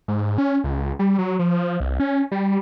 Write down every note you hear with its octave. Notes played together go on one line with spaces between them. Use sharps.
G#2
C#4
C#2
G3
F#3
F3
C2
C#4
G3